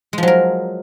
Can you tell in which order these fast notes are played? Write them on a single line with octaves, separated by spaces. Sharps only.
G#3 F3 F#3 A#4